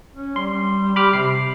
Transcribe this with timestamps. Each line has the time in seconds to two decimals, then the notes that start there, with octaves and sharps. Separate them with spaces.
0.13 C#4
0.36 G3 C6
0.96 G4 B5 D6 F6
1.13 C3 C7